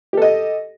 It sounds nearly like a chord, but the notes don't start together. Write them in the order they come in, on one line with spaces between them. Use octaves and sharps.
G4 A4 D#5